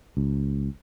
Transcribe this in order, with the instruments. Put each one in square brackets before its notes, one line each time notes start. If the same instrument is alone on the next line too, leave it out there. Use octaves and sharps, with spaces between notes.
[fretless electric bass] C#2